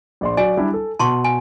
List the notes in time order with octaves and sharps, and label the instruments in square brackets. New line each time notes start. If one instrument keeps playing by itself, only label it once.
[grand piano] A#1 D5 C6
[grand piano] F#3 F#4 D5 [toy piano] G#5
[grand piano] G3 D4 E4
A4
[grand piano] B2 [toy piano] A5 C6 C#6
[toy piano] G#5